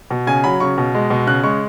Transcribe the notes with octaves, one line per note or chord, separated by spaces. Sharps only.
B2
C#3 G#5
F#3 B5
C#3 C#6
B2
G#3
B2
C#3 F#6
G#3 C#6